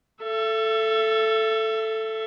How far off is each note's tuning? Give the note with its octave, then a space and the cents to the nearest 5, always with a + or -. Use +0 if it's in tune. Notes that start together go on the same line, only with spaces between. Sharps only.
A4 +0 E5 +30